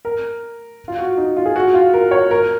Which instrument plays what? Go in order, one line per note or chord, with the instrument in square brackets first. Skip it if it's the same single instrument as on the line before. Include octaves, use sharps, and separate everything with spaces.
[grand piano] A#4
F4
F#4
D#4
F4
G#4
F#4
F4
A#4
C#5
A#4